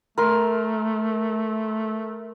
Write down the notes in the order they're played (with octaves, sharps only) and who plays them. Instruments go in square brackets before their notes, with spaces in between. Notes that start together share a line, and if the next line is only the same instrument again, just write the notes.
[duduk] A3 [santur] A#4 C6